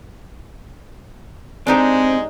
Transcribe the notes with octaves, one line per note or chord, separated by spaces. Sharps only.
G#3 C4 D4 D#4 G4